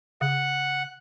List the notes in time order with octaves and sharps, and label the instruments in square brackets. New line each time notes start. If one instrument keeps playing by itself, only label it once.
[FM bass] C#3 [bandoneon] F#5